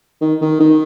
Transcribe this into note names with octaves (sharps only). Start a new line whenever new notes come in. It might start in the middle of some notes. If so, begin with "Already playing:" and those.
D#3
D#3
D#3